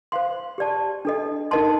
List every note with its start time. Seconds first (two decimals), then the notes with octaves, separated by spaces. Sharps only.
0.12 C5 F5 C6
0.58 G4 D5 A5
1.05 D4 A4 D#5
1.51 D#4 A#4 D#5 A5 C6